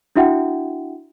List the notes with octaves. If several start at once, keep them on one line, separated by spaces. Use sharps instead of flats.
D4 E4 F#4 E5 F#5 G5